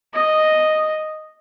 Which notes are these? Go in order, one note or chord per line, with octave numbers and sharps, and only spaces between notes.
D#5